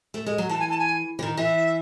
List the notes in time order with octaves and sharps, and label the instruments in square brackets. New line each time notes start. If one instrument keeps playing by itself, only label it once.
[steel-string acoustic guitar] A3
G#3
F#3
[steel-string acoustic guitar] E3 [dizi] A5
[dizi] G#5
A5
G#5
[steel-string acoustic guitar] E3
D#3
[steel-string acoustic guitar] E3 [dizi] E5